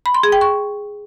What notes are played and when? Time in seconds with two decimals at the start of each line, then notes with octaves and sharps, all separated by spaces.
0.06 B5
0.15 C6
0.23 G#4
0.32 G5
0.41 C#6